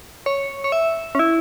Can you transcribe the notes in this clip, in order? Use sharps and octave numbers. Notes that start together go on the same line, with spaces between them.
C#5
C#5
E5
C#4
E4